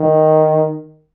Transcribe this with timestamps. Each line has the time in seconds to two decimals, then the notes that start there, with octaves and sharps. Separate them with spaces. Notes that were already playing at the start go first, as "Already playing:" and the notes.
Already playing: D#3